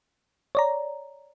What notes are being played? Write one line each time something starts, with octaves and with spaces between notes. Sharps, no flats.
C#5 D5 A#5